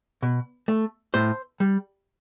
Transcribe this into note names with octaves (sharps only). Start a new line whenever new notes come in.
B2
A3
A2 C5
G3